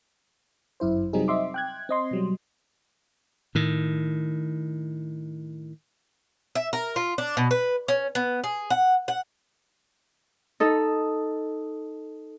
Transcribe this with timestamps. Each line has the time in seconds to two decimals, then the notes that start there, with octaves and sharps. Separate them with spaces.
0.80 G1 F#2 E4 C5
1.13 C3 F#3 G3 C4 D#4 G#4
1.28 C4 D#5 E5 C6 D6
1.54 G5 F#6 G#6
1.89 C4 D#5 C6
2.11 B2 F#3 G3
3.55 A2 D#3
6.55 E5
6.73 A#4
6.96 F4
7.18 D4
7.37 B2
7.51 B4
7.88 C#4
8.15 B3
8.44 G#4
8.70 F#5
9.08 F#5
10.60 D#4 A4